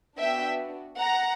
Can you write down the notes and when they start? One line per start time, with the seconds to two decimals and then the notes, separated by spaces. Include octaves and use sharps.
0.18 B3 D4 F#4 E5 G5
0.99 F#5 A#5